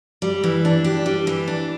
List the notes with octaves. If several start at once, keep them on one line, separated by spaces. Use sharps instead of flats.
G3
E3
D4
G4
G3
E3
D4